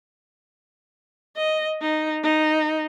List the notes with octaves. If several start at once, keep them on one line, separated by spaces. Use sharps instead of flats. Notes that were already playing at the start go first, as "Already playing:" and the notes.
D#5
D#4
D#4